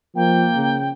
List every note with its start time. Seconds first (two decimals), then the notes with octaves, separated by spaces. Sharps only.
0.16 F3 A#3 G5
0.55 C#3